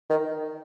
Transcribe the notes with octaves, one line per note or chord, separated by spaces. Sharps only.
D#3